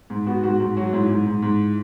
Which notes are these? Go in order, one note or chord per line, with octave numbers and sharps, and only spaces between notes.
G#2
B3 F#4
G#2 F#4
G#2 F#4
F#3 F#4
G#2 E4
G#2
G#2
G#2